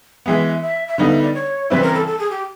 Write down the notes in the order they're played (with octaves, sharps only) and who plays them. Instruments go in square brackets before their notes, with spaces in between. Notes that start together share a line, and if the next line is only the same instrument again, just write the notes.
[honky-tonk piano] E3 G#3 B3 [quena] E5
[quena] E5
E5
[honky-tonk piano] D3 G3 B3 D#4 [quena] F5
[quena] E5
D5
C#5
[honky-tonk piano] C#3 E3 G3 C4 E4 [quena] B4
[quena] A#4
A4
A4
G#4
G4